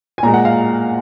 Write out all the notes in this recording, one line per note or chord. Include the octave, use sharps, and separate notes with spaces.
G#5
A#2 G#3 A#5
F#5
F5